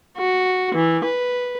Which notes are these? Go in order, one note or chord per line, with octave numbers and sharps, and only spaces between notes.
F#4
E3
B4